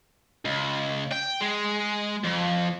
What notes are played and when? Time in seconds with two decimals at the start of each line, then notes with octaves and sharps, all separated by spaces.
0.45 C#2
1.12 G5
1.41 G#3
2.24 F2